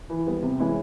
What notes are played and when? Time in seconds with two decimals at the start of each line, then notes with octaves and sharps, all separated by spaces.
0.10 E3
0.27 G3 B3
0.42 C3
0.59 E3 G#3 C#4 E4